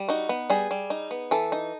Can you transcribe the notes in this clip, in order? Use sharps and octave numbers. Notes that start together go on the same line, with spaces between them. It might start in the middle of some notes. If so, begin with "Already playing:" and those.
Already playing: G3
D#4 F#4
B3
G3 G#4
G3
D#4
B3
E3 A4
D#4